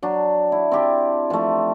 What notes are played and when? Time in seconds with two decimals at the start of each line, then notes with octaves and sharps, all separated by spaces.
0.03 F#3 D4
0.52 E4
0.72 C4 G4 A5
1.30 F3 A3